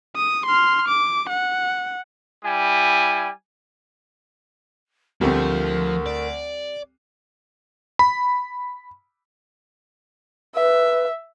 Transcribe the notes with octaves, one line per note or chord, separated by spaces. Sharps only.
D#6
C6 F6
D6
F#5
G3 E4 G#5
D2 F3 G3 A3 C4 A#4
D5
B5
B4 E5